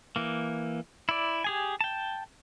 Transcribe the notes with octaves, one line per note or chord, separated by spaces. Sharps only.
E3 A#3
E4 D5
G4 G#4 G#5
G5 A5